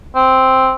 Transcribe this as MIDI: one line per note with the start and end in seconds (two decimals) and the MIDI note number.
0.16 0.75 60